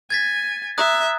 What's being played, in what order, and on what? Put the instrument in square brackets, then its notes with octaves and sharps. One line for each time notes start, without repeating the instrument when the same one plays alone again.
[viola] G#5 [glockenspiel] G#6 A6 B6
[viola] E5 [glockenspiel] A#5 D#6 F#6